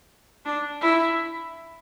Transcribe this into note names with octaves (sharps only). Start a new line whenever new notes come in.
D4
E4